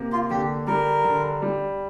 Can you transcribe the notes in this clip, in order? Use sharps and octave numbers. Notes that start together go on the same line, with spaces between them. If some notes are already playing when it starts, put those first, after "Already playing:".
Already playing: C3 A#3
F4
D3 G4
G3 A#4
D3
G3